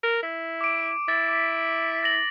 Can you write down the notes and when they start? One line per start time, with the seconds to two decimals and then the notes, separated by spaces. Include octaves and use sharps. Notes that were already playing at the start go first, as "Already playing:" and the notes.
0.03 A#4
0.22 E4
0.61 D6 D7
1.08 E4 A6
1.28 D6 B6
2.03 A6 A#6 F#7